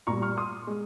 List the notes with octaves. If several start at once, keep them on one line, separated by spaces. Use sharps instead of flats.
A#2 G3 A#5 C#6
C#6 F6
C6 D#6
G#3